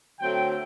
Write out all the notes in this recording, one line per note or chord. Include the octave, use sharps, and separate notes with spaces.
D3 F#3 A3 C4 G5